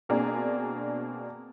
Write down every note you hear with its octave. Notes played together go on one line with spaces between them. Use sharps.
B2 A#3 C4 D4 G#4